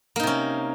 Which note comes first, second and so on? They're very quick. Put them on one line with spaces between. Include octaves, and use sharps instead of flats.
A#3 D#4 C3 C#4